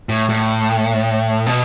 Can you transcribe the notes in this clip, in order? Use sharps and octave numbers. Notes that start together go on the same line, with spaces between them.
A2
A2
B2